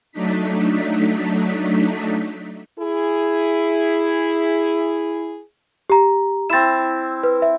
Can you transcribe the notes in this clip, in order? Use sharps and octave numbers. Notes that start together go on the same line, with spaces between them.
F#3 A3 D4 D#4 B6
E4 G#4
G4 A#5
C4 E4 A6 E7
B4
E5